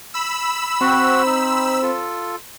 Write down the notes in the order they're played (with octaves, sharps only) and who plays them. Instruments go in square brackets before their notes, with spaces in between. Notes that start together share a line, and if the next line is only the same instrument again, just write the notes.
[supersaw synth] B5 E6
[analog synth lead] C4 [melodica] F#4 F#5
[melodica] D#4
F4 A4